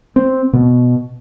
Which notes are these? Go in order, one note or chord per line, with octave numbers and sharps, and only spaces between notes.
C4
B2